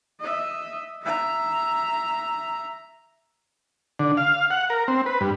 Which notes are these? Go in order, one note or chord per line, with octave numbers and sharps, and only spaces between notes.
D#5 E5
E5 A#5
D3
F5
F#5
A#4
C4
B4
G2